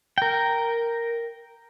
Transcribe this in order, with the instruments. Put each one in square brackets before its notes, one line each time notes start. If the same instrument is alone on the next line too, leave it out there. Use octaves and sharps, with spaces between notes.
[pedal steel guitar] A#4 G5